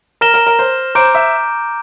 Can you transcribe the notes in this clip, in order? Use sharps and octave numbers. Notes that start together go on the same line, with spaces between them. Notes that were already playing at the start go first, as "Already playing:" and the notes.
A#4 F6 A#6 E7 G7
A#4
A#4
C5
C5 A#5 D6 G6 D7
E5